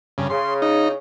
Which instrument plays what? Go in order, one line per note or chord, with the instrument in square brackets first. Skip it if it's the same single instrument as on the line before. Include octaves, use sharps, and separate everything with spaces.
[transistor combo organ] G2 C#3
[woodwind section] C#3 [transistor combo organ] C6
[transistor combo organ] D#4